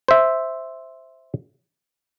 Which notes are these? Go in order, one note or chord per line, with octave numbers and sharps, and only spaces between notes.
C5 E5